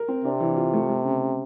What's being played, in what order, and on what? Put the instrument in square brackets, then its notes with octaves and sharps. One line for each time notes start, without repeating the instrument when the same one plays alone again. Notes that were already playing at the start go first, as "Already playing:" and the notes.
Already playing: [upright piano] A#4
C4
[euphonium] C3 [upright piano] D4
[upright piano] E3
F4
A3
A3
C#3
C#3